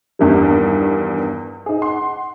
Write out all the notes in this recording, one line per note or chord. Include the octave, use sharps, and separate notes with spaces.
E2 G2 D#3 F3 G3
D#4 G#4
F#5 C6